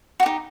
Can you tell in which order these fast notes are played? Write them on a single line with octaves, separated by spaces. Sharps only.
F#4 G4 D#4